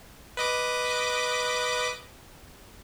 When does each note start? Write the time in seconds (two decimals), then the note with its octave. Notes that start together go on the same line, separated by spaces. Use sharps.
0.37 B4 D#5 D6